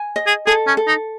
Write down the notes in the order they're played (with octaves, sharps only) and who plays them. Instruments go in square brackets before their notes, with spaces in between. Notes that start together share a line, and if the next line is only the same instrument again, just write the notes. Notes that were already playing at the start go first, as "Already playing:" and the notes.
Already playing: [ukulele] G#5
D#5
[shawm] G#4
[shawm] G#4 [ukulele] A4
[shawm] C#4
[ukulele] A4
[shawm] D#4